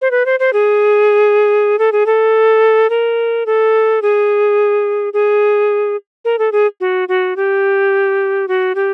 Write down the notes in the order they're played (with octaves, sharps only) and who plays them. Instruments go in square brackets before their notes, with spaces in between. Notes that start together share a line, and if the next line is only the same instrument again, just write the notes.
[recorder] C5
B4
C5
C5
G#4
A4
G#4
A4
A#4
A4
G#4
G#4
A#4
A4
G#4
F#4
F#4
G4
F#4
G4